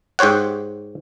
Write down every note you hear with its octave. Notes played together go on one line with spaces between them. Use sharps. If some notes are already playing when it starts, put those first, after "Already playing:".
G#2 G4 C5 C#5 F#5